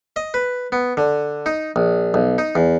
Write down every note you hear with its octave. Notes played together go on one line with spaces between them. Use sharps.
D#5
B4
B3
D3
D#4
A#1
B1
D#4
E2